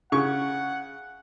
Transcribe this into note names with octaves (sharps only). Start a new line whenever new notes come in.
C#3 F#5 C#6